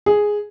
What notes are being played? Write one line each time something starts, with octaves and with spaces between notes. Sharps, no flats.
G#4